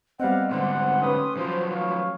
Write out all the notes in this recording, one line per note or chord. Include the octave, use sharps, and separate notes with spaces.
G3 B3 C4 D#5 F5 F#5
G#2 D3 F#5 C6
A3 C#4 G4 B4 D#6
F3 F#3 G4 C5
A3 C#5 F5